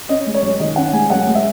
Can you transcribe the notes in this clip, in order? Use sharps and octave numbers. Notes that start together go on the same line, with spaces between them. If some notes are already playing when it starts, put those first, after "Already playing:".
C#4 D#5
G#3
C#5
F#2
D#3 D#5
C#4 F#5
G#3 G#5
F#2 F#5
G#3
E5